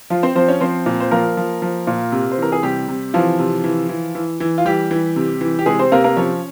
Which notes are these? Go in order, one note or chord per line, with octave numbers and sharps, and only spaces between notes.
F3 F4
C4 C5
F3 C4 C5
C#4 C#5
F3 C4 C5
A#2
C5
F3 A#3 A#4
F3
F3
A#2
C3
C5
E3 A#4
G#4
C3 G3 G4
C3
E3 F3 F4
C3
E3
E3
E3
E3
F4
E3 G3 G4
E3
C3
E3
G4
C3 G#3 G#4
C4 C5
C3 A#3 A#4
A#3 A#4
F3 C#4 C#5